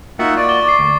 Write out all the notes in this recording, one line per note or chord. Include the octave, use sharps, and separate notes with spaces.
A#3 D#4 F4 F#4 E5 F#5
D5 C#6 A6
C#6 D6 G7
C#6 D6 C7
D2